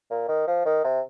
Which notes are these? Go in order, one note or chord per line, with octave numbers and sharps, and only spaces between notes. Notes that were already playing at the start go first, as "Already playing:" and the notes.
A#2
D#3
F3
D#3
C3